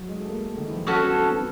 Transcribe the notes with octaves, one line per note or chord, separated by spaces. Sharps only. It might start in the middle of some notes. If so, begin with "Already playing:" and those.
Already playing: F#3
G#3
A3
A#3
A3
D#3
E3
F3
G3 C#4 F#4 A4
B3
C4
B3